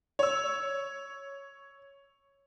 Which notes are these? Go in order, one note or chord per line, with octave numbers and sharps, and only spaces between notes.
C#5 E6